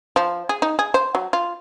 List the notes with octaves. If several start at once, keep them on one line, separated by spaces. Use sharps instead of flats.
F3
G#4
D#4
G#4
C5
F#3
F4